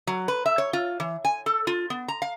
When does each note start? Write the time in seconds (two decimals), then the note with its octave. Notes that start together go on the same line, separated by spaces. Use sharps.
0.07 F#3
0.28 B4
0.46 E5
0.58 C#5
0.73 F4
1.00 E3
1.25 G#5
1.46 A4
1.67 F4
1.90 B3
2.08 A#5
2.22 F5